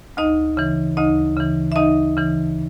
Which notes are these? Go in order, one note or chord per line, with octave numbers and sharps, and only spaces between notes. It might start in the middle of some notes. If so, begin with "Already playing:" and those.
D2 D#4 D#5
C#3 E3
D2 D#4 D#5
C#3 E3
E5
D2 D#4 D#5
C#3 E3